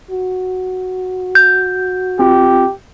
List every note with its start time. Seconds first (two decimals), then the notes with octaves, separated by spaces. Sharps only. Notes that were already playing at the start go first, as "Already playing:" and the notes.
0.11 F#4
1.35 G6
2.19 C4 F4 G4